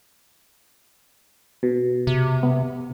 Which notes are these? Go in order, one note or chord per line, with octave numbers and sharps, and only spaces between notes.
B2
C3
B3